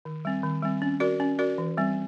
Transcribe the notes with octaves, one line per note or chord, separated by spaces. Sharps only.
D#3
G3 C4
D#3
G3 C4
C#4
F#4 A#4 D5
C#4
F#4 A#4 D5
E3
G3 C4